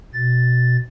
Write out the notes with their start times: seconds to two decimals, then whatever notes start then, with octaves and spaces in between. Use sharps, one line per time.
0.14 B2 A6